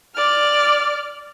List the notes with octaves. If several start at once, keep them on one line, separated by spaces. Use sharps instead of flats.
D5 F6